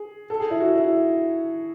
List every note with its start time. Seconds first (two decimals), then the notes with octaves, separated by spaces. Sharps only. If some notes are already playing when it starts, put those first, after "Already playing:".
Already playing: G#4
0.30 A4
0.40 G#4
0.50 E4
0.60 F#4
0.76 E4